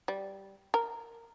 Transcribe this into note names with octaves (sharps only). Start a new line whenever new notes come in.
G3
A#4